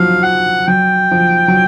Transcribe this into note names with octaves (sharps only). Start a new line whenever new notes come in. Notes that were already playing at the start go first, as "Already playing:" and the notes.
Already playing: F3 F#3 F5
F#5
F#3 G5
F3
F#3